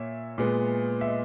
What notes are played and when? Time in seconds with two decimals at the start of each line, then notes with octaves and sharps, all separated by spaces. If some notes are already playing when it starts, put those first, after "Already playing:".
Already playing: A#2 A#3 C#5 E5
0.38 A#2 G#3 B3
1.01 E5
1.08 D#5